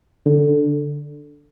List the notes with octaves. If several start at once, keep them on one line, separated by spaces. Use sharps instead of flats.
D3